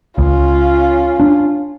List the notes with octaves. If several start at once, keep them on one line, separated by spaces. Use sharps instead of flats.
C#2 C#4 F4
D4